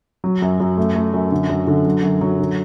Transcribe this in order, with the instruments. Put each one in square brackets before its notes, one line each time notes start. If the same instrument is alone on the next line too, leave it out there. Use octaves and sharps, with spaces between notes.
[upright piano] F#3
F#2
F#2
A3
A3
F#2
D3
F#2
D3
F#3
F#2
F#3
D3